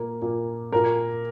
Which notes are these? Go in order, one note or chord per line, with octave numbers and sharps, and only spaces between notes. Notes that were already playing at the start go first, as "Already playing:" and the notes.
Already playing: A#2 A#3
A#2 A#3
A#2 A#3 A#4